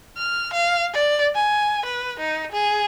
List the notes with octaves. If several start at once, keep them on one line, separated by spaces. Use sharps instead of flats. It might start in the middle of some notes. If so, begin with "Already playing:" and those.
F6
F5
D5
G#5
B4
D#4
G#4